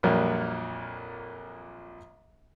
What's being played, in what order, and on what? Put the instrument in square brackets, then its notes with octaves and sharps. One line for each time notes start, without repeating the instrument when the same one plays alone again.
[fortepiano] A#1 F2 A#2 F#3 G3 A#3